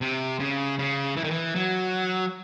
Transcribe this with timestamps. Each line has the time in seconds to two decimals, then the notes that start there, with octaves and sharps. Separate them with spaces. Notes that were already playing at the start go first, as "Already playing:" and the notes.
0.01 C3
0.40 C#3
0.79 C#3
1.17 E3
1.24 D#3
1.31 E3
1.55 F#3